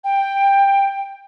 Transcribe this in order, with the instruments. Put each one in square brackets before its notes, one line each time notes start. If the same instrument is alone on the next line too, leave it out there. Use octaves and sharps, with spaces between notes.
[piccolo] G5